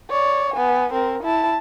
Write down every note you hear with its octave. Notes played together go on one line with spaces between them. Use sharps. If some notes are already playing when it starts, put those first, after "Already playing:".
C#5 D5
B3 G#5
C4 A#4
E4 A5